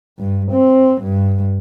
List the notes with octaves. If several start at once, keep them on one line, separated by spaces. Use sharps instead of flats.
G2
C4
G2